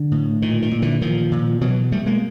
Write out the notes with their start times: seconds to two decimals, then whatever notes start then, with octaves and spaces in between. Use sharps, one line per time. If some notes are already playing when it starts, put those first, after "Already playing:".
Already playing: D3
0.12 A2
0.42 A#2 D#3
0.62 D#3
0.71 A#2
0.82 D3 E3
1.02 A#2 D#3 F3
1.31 A#2
1.61 B2 E3 F#3
1.92 B2 G3 A3
2.06 G#3 A#3